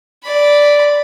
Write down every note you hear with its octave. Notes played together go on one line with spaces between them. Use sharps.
D5 B5